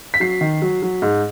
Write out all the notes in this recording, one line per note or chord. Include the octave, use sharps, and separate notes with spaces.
B6
F#3 C7
D#3
F#3
F#3
G#2